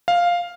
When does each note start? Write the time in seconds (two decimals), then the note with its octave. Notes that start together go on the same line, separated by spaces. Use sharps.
0.08 F5